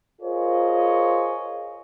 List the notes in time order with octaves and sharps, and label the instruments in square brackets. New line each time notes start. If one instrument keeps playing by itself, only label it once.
[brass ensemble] F4 G#4 A#4 C5 C#5 D#5